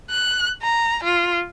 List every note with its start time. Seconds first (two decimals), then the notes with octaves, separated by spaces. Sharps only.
0.10 F#6
0.62 A#5
1.04 F4